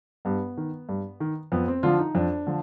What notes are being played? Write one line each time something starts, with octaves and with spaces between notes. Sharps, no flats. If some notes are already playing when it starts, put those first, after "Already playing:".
G2 B3
D#3
G2
D#3
F2 B3
C4
D3 F3 F4
D#4
F2 D4
D3 F3